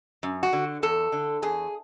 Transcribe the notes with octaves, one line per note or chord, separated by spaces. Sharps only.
F#2
F#4
D3
E2 A4
D3
E2 G#4